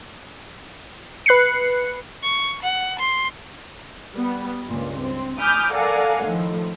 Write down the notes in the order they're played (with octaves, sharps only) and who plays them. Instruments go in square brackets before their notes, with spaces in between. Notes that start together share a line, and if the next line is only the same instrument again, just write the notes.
[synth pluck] B4 F#6 C7 C#7
[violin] C#6
F#5
C6
[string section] G3 B3
C#2 G2 A#2
C4
G#5 B5 D6 D#6 F6 G6
A4 A#4 D5 F5 F#5 G#5
A2 D#3 F3